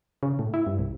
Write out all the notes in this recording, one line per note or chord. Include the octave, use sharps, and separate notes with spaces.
C#3
A2
E4
G2
C2